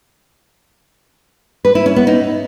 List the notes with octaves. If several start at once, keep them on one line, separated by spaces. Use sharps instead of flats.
B4
E4
C#4
B3
D#4